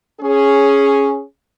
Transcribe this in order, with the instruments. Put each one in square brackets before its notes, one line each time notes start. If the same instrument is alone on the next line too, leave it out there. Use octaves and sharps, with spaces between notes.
[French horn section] C#4 G#4